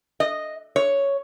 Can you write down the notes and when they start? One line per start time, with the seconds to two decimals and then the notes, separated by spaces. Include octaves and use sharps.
0.20 D#5
0.76 C#5